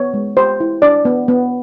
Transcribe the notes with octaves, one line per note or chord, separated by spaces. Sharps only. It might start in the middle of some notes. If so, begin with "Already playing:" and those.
Already playing: B3 C#5
G#3
G4 C5
E4
D4 D5
B3
B3